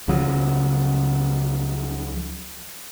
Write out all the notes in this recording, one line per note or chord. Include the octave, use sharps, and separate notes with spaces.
C#2 C#3 F3 F#3